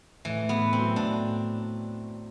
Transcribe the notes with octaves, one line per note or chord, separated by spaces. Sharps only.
A2 E3
A3
B3
A2
C4
F#3
A2 D4